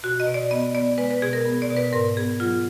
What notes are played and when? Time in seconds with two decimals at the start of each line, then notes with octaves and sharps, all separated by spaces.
0.03 B2 F#4
0.20 D#5
0.27 B2
0.34 D5
0.51 B3 D#5
0.75 B3 D5
0.98 G#3 B4
1.11 B4
1.22 B2 G#4
1.33 A#4
1.45 B3
1.62 D5
1.70 B2
1.77 B4
1.92 G#2 A#4
2.17 B3 G#4
2.40 F#3 F4